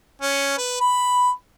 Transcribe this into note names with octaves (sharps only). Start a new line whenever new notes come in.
C#4
B4
B5